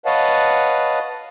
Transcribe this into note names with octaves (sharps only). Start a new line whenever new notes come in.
B4 C#5 D#5 F5 F#5 A5